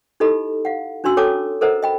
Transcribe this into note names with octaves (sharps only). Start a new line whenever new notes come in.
D#4 E4 G4 A4 D#5 B5
F5 F#5
C#4 D4 F#4 C6 E6
A4 C#5 G5 A5 D6 D#6
A4 A#4 C5 D#5 F#5 A#5
D#5 G5 B5